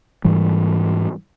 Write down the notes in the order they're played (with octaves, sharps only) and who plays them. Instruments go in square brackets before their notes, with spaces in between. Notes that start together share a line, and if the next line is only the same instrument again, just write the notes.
[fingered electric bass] G#2 E3 G3